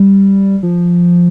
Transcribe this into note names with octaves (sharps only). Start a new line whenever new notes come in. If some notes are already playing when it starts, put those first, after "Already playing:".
Already playing: G3
F3